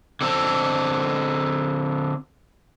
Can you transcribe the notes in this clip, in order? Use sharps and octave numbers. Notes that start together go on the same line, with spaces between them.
D3 C4 A4